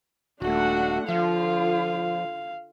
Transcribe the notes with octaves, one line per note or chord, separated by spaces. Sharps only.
D#1 A3 D4 F#4 F#5
D3 F3 F4 F5